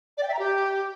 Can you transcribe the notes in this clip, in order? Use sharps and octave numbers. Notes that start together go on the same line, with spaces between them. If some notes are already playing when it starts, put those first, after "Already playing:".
D5
G5
E5
A#5
G4